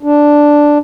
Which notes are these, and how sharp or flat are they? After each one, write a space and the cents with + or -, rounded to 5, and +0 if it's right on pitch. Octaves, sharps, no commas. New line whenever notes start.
D4 +0